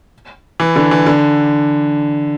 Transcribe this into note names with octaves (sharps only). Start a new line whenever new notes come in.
E3
D3
E3
D3